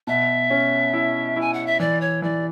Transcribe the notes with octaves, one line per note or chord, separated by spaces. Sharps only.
B2 E5
C#4
E4
E4 G#5
F#5
E5
E3 D5
C#5
E3 D5